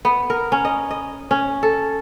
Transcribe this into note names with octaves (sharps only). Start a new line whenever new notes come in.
B3
A#4
C#4
D#5
D#5
C#4
A4